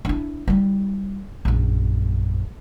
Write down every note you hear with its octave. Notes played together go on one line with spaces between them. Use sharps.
D4 E4
G3 E4
A#1 F#2